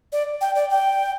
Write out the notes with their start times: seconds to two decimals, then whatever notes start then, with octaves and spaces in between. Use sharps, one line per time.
0.12 D5
0.41 G5
0.55 D5
0.70 G5